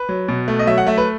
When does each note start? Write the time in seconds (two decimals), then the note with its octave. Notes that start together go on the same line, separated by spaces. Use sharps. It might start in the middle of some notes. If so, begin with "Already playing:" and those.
Already playing: B4
0.09 F#3
0.28 B2
0.48 A3
0.59 D#5
0.67 F#3 E5
0.78 F#5
0.87 A3 E5
0.98 B4